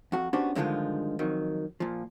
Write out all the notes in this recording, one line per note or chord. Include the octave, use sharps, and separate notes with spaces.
F2 F#4
B3 C#4 D4 F#4 G4 C5
G2 D3 D#3 F3 G#3 F4
F2 D#3 F#3
A#2 F3